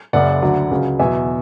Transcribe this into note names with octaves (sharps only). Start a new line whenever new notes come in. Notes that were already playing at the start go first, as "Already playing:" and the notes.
F#1 F#2 C#3 D5 F#5
D2 D3 F#3
C#2 C#3 F#3
E2 B2 F#3 E5 G#5